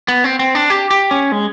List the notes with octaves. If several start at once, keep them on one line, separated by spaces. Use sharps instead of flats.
B3
C4
C4
D4
G4
G4
C#4
G#3